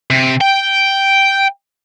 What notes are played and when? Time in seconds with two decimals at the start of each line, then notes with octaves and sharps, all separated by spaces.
0.10 C3
0.41 G5